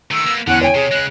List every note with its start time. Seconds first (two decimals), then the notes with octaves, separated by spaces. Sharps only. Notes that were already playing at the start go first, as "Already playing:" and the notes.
0.11 D#3 A3 E6
0.26 A#3 B3
0.47 E2 D3 C#4 F#5 F#6
0.61 C#5 G5 G#5
0.75 C3 G#4
0.91 C#3 G#3 F#6